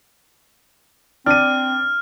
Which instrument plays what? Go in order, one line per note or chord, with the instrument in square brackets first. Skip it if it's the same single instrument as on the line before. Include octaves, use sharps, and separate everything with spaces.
[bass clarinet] C4 [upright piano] D4 D#7 [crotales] F6